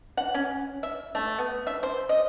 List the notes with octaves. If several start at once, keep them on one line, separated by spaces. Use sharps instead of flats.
F#5
C#4
E5
A3
B3
E5
C5
D#5